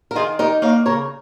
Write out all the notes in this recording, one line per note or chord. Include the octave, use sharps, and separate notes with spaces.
A#4
D#3 F4 G#4
D#4 G4 A#4
A#3 C#5 F5
C#3 A#4 C#5